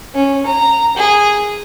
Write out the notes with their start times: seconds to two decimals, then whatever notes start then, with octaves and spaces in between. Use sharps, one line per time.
0.15 C#4
0.46 A#5
0.97 G#4